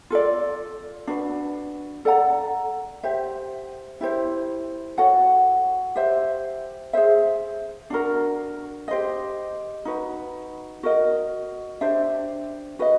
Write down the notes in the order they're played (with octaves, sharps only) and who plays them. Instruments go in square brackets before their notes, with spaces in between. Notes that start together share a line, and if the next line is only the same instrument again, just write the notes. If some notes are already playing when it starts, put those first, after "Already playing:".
[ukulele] F4 A4 D5
D4 F#4 B4
A4 D5 F#5 A#5
G4 C5 E5
E4 G4 C5
F#4 A4 C#5 F#5
G4 C5 E5
G#4 C5 E5
D4 F#4 A#4
G4 C5 D#5
D#4 F#4 B4
F#4 A#4 D#5
D4 G4 C5 E5
F#4 B4 D#5